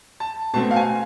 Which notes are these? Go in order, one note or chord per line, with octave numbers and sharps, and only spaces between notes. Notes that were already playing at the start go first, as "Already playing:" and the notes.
A5
B2 A3 C4 A5
F5
G#5